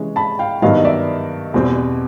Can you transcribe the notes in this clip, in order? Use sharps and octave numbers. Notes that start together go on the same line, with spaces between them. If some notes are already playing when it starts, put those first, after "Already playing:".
Already playing: C3 E3 G#3 C#4
A5 B5
F5 G5
G2 D#3 F#3 B3 D#5 F5
D5 E5
E2 B2 G3 C4